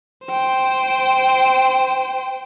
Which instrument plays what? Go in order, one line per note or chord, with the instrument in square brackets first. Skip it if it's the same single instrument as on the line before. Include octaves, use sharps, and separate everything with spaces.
[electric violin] C5 G5